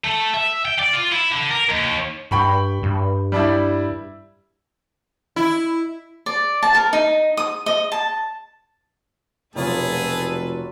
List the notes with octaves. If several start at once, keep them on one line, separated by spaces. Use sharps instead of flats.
A3
E5
G5
D5
F4
E4
D3
A#4
D#2
G2 G5 B5 C#6
G2
G3 D4 E4
E4
D5
A5
A#4
D#4
D#6
D#5
A5
F1 B2 F#3 A3 F4 G#4 A4 B4